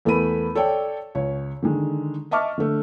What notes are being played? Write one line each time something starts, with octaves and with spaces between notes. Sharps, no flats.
E2 A3 B3 A#4 B5 D#7
A4 C#5 D5 G5
C#2 C#5
D3 D#3 G#3
D#5 E5 A5 C#6 D6 F6
D3 A3